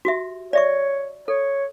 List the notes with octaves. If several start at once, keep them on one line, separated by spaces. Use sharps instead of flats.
F#4 G4 E5
C#5 D5 E5 C#6
A4 C#5